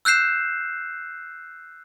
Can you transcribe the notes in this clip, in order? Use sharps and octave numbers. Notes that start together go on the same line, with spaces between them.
E6 F#6 G6 C7 E7